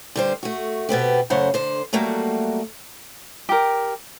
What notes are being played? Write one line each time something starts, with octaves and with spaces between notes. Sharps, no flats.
D3 G3 C5
A3 F#4
B2 B3 C4 G4
F#2 C#3 A3 C5 F#5
D3 C5
F#3 G3 A3 A#3 F#4
G4 A#4